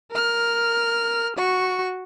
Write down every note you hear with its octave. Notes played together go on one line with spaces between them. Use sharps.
A#4 F6
F#4 C#6